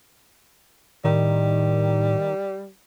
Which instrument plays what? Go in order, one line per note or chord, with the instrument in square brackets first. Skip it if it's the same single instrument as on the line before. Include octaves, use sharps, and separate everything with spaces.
[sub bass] A2 [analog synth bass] D#3 [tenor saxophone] G3